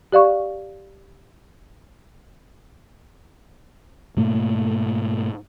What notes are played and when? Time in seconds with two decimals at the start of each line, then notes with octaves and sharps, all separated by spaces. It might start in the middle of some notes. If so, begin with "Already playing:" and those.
0.12 G4 D5 F5 C#6
4.17 G#2 B2 A3 A#3